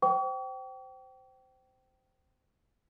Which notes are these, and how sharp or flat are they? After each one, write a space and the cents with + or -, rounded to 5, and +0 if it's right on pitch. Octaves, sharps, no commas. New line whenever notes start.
C5 -15 G5 -25 C#6 +45